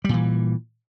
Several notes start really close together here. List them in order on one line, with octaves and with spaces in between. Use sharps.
G3 A#2 E3